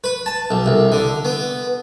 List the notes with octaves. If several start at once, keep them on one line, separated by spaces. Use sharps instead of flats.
B4
A5
B1
C2
D3
B3